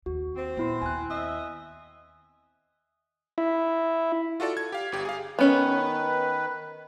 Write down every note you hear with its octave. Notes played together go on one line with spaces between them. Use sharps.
D#2 F#4
C4
A#2 B3 E4 C6
D#2 G#5 F#6
D#5 E5
E4
F4 F#4 A4 D5
G#6
G4 F5
G1 G4
G#4 F5
D#3 B3 C#4 B4